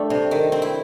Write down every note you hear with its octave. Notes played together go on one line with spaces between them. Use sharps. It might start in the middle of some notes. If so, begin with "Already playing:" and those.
Already playing: G3 A3 D4
C3
D#3
C4
E4